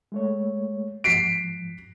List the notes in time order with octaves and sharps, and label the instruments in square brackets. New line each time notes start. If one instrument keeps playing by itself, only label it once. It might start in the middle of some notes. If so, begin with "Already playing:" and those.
[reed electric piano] G#3 A3 C#5
[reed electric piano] G#2 F3 [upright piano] B6 C7 D7